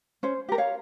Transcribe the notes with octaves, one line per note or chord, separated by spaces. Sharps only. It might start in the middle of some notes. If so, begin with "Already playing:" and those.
C#4 C5
G4 A#4
C#5 F5